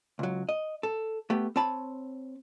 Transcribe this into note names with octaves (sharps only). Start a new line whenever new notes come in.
C#2 F#3
D#5
A4
A3 B3 G4
C4 C#5 A5 B5